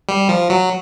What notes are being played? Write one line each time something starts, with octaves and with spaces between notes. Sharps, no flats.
G3
F3
F#3